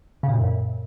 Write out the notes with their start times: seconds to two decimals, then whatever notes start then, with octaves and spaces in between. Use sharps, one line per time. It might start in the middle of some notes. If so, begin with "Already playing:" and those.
0.23 C#3
0.28 A#2
0.34 A2
0.39 F#2